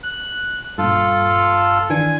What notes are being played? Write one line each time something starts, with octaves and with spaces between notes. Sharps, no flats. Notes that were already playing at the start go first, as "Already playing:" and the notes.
F#6
G2 A#2 F4 A4
D#3 E3 D4 G#5